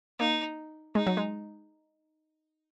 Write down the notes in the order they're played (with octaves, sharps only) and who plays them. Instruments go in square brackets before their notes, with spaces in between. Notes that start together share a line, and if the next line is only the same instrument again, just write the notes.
[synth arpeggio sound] A#3 [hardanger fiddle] D#4
[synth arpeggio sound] G#3 [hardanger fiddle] D#4
[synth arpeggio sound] F#3
G#3